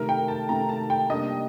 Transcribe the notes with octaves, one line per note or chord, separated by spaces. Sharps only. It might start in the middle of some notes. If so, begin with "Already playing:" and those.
Already playing: C3 D#3 A3 A#4
G5
A5
C3 D#3 A3 A#5
A5
G5
C3 G3 A#3 D4 D#5